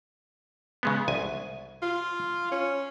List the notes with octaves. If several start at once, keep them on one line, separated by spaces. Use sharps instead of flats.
C#3 G#3 B3
C2 G#5
F4
C#4